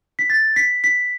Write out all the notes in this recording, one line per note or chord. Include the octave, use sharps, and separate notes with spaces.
B6
A6
B6
B6